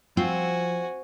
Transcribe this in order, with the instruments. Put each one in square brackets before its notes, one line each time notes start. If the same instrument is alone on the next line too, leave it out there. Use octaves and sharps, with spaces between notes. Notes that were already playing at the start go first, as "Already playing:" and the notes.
[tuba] F3 [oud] C4 [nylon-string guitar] F4 [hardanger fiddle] F#4 G#5